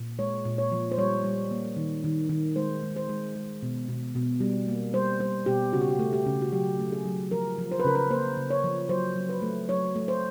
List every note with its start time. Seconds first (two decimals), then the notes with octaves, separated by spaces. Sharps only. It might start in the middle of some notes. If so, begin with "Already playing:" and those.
Already playing: A#2
0.19 G#3 C#5
0.45 A#2
0.58 C#5
0.72 F3
0.92 C5
0.98 G3 C#5
1.24 G3
1.51 A#3
1.77 D#3
2.04 D#3
2.29 D#3
2.56 G#3 C5
2.83 G#3
2.96 C5
3.09 G#3
3.36 G#3
3.63 B2
3.89 B2
4.15 B2
4.41 G3
4.68 A#3
4.94 G3 C5
5.20 G3 C5
5.46 B2 G4
5.73 C#3 F#4
5.81 G4
5.89 F#4
5.99 A3
6.13 G4
6.26 C#3
6.42 F#4
6.52 F#3 G4
6.79 A3
6.92 G#4
7.06 F#3
7.31 F3 A#4
7.58 F3
7.71 C5
7.80 B4
7.84 C#3 A#4
7.95 B4
8.10 A#3 C5
8.37 C#3
8.50 C#5
8.64 F3
8.89 F#3 C5
9.16 F#3
9.29 B4
9.42 A3
9.69 F#3 C#5
9.96 A3
10.08 C5